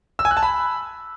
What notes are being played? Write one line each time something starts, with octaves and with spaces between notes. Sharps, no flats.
E6
G#5
F#6
A5
B5